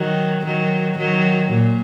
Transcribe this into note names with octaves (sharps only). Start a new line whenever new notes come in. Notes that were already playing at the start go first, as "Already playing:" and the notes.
Already playing: D#3 F#3
D#3 F#3
D#3 F#3
A#2